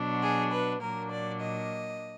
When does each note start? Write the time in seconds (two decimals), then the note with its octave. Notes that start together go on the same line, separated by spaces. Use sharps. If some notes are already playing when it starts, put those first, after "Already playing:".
Already playing: B2 F#3 D4
0.22 G#4
0.51 B4
0.81 A#2 F#3 A#3 D4 A#4
1.11 D5
1.41 D#5